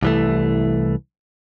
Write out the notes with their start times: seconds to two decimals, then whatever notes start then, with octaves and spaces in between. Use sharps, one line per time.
0.02 C2 E3 A3